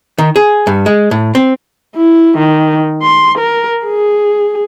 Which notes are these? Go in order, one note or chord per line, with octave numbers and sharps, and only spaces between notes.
D#3
G#4
G2
G#3
A2
C4
E4
D#3
C6
A#4
G#4